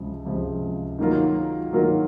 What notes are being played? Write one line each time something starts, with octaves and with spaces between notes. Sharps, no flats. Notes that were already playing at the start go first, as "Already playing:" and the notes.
Already playing: C#2 C3 F3
C#2 C3 F3
D#3 F#3 A#3 F4 A#4
D#3 F#3 A#3 F4 A#4